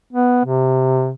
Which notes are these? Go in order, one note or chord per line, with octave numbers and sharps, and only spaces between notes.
B3
C3